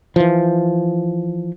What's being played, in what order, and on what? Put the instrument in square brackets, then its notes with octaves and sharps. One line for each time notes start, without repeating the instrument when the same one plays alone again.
[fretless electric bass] E3 F3